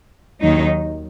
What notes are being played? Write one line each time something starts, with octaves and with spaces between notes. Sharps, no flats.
D#2 D#3 F#3 D#4